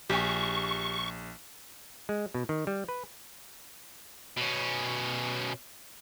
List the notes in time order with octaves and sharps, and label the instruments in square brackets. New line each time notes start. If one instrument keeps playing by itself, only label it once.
[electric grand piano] A#1 [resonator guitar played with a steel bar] G4 G#5 [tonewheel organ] C#6
[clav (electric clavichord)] G#3
B2
D#3
G3
B4
[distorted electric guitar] B2 C#4